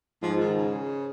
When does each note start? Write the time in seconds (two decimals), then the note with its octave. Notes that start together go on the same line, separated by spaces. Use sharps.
0.22 G#2 F3
0.40 D#3
0.57 C#3